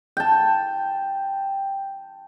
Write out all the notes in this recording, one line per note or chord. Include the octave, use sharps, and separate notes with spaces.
G5 A5